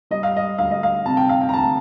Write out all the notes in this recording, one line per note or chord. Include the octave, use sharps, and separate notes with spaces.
G3 D#5
F5
D#5
D2 F5
D#5
F5
C3 A5
G5
F5
G5
A#5
D2 A5